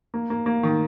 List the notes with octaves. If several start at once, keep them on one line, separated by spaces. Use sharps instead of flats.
A#3
A#3
A#3
D#3